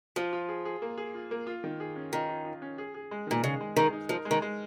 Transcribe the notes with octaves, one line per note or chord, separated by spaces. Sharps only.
F3 F4
F4
G#4
G#4
A#3
G#4
F4
A#3
F4
D#3
G#4
C#4
D#3 F4
F4
F4
C#4
G#4
G#4
G#3
A#2 D#3
C#3 G#4
G#3
D#3 G#4
D#4
F3 A#4
G#3
D#3
G#3